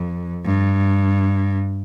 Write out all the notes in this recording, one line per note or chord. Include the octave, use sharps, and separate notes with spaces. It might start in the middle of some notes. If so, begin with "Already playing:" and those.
Already playing: F2
G2